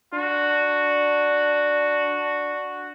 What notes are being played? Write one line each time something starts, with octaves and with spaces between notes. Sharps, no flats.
D4 F#4